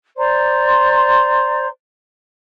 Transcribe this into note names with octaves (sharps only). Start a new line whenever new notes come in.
C5 D5 A#5 C6